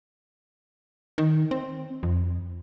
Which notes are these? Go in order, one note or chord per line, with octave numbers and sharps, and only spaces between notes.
D#3
C4
F2